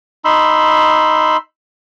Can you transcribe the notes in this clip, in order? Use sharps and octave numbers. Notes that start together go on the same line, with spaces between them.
D#4 B5 C6 E6